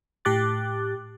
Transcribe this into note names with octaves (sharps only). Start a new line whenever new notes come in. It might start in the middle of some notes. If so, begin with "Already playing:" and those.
A2 G4 D6 F#6 A6